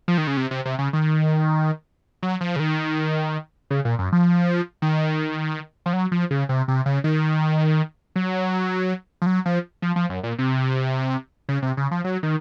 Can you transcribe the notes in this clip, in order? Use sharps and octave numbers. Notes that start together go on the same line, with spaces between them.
F3
D#3
C#3
C3
C3
C3
C#3
D#3
F#3
F3
C#3
D#3
C#3
A#2
F#2
F3
D#3
F3
F#3
F3
C#3
C3
C3
C#3
D#3
F#3
F3
F#3
F3
F3
F3
F#2
A#2
C3
C#3
C3
C#3
F3
F#3
D#3